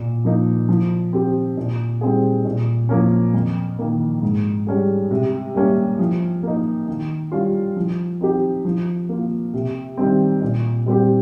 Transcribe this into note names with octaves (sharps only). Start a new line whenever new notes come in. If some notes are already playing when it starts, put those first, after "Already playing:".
Already playing: A#2
F3 A#3 D#4
F3
C4 G4
A#2
G3 C4 D#4 G#4
A#2
F3 A#3 C#4
F2
D#3 A#3
G#2
G3 C#4 G#4
C3
G3 A#3 C#4
F3
A#3 D#4
D#3
G3 C#4 F4
F3
C4 D#4 G4
F3
A#3 F4
C3
D#3 G3 C4
A#2
G3 C4 G4